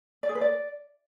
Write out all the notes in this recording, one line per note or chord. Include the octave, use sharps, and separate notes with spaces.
D5
G#4
B4
D5